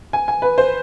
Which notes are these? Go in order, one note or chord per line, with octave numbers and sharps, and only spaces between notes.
G#5
G#5
B4
C5